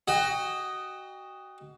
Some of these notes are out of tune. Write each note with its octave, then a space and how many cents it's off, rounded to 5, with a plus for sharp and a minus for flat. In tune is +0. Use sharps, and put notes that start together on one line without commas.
F#4 +20 D#5 +0 G5 +40